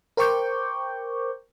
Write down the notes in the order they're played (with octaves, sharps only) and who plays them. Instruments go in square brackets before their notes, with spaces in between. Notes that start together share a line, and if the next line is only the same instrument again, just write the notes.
[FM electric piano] A#4 C5 G5 C#6 D6 G6